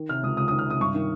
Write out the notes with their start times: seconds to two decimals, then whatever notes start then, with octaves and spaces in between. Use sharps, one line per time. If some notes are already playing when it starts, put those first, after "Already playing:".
Already playing: D#3
0.09 C3 F6
0.23 C#2 D#6
0.37 C#2 D#6
0.48 D#3 D#6
0.59 F6
0.67 C3 D#6
0.80 G2 C#6
0.94 D#3